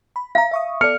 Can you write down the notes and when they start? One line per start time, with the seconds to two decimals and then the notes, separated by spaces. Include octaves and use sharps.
0.16 B5
0.35 E5 F5 A#5
0.51 E5 C#6 D#6
0.81 B3 A4 D5 F6 C#7